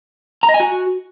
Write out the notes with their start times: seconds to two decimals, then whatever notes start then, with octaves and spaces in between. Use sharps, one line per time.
0.43 A#5
0.49 D#5
0.54 G#5
0.60 F#4